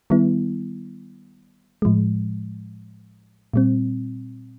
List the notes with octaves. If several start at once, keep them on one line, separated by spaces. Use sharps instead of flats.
D#3 G3 B3 E4
A2 F3 G#3
A#2 G3 C4